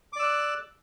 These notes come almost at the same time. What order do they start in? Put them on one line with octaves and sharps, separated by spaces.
D6 D5 E6 F#6